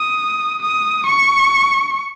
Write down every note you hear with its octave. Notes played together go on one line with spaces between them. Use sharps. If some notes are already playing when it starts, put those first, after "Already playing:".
Already playing: D#6
D#6
C#6